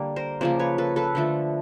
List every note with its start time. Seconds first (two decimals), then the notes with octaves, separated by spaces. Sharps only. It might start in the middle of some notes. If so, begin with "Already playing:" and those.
Already playing: D3 G3 A#3
0.16 A#4 C5
0.41 C#3 F3 A#3 C5 D5
0.59 B4 C#5
0.78 A4 B4
0.96 A4 B4
1.15 D3 F3 A3